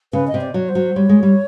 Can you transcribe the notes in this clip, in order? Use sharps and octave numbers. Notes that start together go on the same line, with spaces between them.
C#3 B4
D#5
C3
D5
F#3 C#5
C5
F#3
G3 C#5
G#3
G3